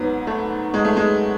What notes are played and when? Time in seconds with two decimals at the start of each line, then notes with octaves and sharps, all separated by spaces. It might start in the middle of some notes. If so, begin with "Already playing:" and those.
Already playing: G#2 F#3 B3
0.27 A3
0.74 G#3
0.85 A3
0.97 G#3